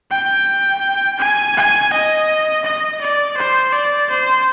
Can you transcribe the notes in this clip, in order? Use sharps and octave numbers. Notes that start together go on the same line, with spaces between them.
G5
G#5
G#5
D#5
D#5
D5
C5
D5
C5